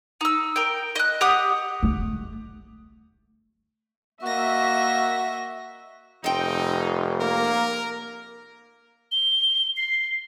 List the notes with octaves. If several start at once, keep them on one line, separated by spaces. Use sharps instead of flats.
D#4 E6
A#4 G5
D#5 F#6
G4 F#5 D#6
A3
A#3 F#4 D#5 E5 A#6
F1 C4 D#4 G5
A#3 A#4
G7
C7